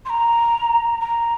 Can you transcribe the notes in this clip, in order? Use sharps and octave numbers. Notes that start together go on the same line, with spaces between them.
C6
A#5
A#5